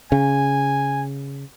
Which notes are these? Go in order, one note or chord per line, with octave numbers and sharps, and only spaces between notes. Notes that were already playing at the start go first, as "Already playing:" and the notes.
C#3 G#5